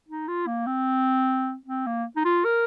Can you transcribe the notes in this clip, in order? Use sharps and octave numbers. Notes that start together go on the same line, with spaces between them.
D#4
F4
A#3
C4
C4
A#3
D#4
F4
A#4